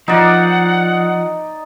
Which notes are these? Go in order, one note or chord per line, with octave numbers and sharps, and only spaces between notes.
F3 D#4 D5 F#5